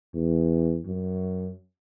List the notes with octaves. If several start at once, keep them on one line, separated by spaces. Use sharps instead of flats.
E2
F#2